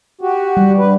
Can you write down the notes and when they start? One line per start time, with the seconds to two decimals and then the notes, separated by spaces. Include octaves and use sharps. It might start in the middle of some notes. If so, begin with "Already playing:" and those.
0.21 F#4 G4
0.57 G3
0.77 G2 B4